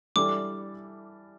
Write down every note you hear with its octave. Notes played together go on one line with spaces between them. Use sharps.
E3 G3 D4 A4 D6